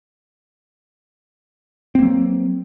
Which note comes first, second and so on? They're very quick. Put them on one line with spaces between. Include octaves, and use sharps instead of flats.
C4 A#3 F#3